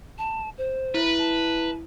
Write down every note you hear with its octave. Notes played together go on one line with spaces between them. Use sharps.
A5
C5
E4 B4
A5